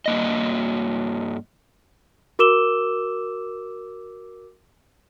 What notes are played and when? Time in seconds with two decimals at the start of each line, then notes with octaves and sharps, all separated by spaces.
0.06 G2 A#3 D#5
2.39 F#4 A#4 D6 E6 E7 G7